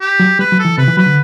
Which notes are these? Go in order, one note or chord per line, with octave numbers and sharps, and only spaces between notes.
G4
F#3
G3 B4
F#3
A4
E3
C3 B4
E3
F#3 B4
D3